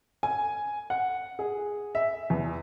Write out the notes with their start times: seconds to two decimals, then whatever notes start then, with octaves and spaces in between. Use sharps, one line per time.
0.23 G#5
0.90 F#5
1.39 G#4
1.95 E5
2.30 E2